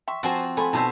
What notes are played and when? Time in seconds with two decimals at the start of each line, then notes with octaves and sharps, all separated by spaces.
0.08 E5 G5 C6 C#6
0.23 F3 C4 F#4 C5 G#5 A5
0.57 A3 A4 G#5 B5 C6
0.73 B2 D#4 C5 E5 A5